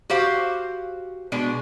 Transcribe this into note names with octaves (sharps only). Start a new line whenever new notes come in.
F#4 G4 C5 F5
B2 G#3 D4